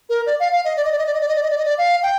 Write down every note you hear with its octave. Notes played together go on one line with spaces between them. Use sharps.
A#4
D5
F5
F5
D#5
D5
D#5
D5
D#5
D5
D#5
D5
D#5
D5
D#5
D5
D#5
D5
F5
G5